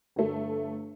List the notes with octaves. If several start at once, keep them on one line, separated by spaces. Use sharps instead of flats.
G1 A3